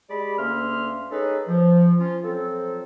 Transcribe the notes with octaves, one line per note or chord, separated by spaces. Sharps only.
G#3 G4 D5 B5
D2 A#3 C#4 E5 C6 F6
C#4 D#4 G#4 A4 B4 D#5
F3
F3 C#4 F4
F3 F#3 C4 A4